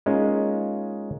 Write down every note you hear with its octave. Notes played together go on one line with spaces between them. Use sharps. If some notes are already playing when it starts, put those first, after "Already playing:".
G#3 A#3 C#4 D#4 F4 G#4